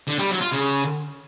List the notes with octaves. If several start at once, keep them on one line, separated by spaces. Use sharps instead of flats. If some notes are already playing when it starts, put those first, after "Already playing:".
D3
G3
F#3
F4
C#3